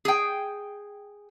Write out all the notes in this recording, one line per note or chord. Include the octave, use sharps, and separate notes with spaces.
G#4 G5